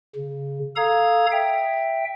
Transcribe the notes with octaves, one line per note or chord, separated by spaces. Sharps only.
C#3
A4 F5 A#5 D#6 G#6
E5 G5